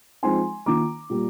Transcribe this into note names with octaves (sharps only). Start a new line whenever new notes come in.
F3 G#3 C4 D#4 G#5 C6
D#3 A#3 F4 A#5 D6
A#2 G3 A#3